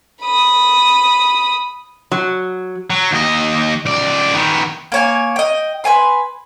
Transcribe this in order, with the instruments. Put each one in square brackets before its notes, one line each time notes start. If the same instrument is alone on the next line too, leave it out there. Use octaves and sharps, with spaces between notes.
[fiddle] B5 D#6
[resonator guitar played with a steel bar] F#3
[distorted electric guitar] F#3
D#2 D#5
C#2 D5
D#3 B3
[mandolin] A#3 C#5 G#5
D#5 G5
B4 C#5 G#5 C6